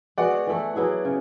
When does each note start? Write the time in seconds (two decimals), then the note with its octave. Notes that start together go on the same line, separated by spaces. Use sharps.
0.18 G#3 B3 F#4 D5 F#5
0.47 E3 A3 E4
0.76 F#3 B3 E4 G#4
1.05 C#3